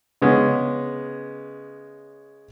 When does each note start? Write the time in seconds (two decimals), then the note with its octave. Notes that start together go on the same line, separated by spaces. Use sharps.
0.22 C#3 G#3 B3 C#4